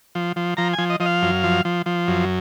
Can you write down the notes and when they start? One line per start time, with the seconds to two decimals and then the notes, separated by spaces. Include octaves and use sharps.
0.15 F3
0.36 F3
0.57 F3 A#5
0.73 G#5
0.78 F3
0.90 D#5
1.00 F3 D#5
1.06 F5
1.22 F#2
1.44 F3
1.65 F3
1.86 F3
2.08 F#2